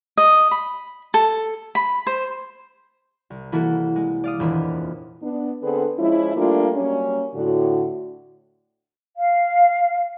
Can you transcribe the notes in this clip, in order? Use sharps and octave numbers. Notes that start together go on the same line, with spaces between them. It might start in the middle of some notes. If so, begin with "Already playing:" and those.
D#5
B5
A4
B5
C5
C2
E3 A#3 E4 F#4 A4
G#3
D5 F5 D#6
D#1 F2 E3 A#3 D4 B5
B3 D4
D3 B3 C4 G#4 A4 B4
F3 G#3 C#4 E4
G3 A3 A#3 D4 F4
F#3 G3 A#3 C#4
A2 D3 F#4
F5